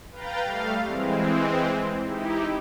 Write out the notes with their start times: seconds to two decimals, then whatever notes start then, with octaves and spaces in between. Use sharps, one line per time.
0.11 B4 F5 G5 A#5 G6 A6
0.45 G3 A3 F5
0.85 E3 G#3 C4
2.00 D#4 E4 G4